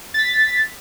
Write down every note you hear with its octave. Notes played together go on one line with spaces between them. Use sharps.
A6 B6